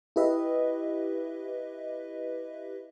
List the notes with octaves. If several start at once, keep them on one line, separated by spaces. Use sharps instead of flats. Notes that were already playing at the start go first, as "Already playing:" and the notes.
E4 G4 B4 D#5 E5